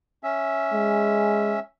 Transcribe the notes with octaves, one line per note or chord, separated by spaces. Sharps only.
C#4 E5
G#3